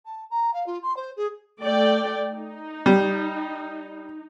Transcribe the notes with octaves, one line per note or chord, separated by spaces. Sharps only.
A5
A#5
F5
F4
C6
C5
G#4
A3 D5 G5
D#4
G3